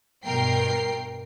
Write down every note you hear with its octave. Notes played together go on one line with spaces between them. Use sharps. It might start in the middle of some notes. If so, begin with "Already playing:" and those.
G2 B2 A#4 G5 C7